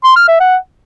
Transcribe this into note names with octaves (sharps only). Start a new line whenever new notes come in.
C6
F6
E5
F#5